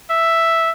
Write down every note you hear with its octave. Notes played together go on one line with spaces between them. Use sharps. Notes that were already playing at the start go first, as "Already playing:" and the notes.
E5